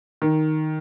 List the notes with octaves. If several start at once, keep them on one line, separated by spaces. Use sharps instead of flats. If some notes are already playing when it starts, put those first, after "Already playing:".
D#3